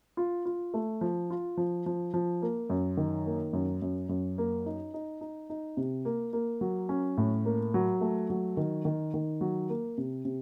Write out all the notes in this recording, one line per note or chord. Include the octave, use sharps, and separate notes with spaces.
F4
F4
A3
F3
F4
F3
F3
F3
A#3
F#2
D#3
A#3
F#2
F#2
F#2
A#3
D#4
D#4
D#4
D#4
C3
A#3
A#3
F#3
C#4
A2
A#3
F#3
A3
F#3
D#3
D#3
D#3
F#3
A#3
C3
C3